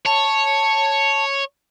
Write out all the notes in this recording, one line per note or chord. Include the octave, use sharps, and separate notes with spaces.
C#5 A5